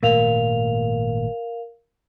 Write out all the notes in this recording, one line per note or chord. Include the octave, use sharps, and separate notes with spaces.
G#1 A#2 A3 A#4 F5 F7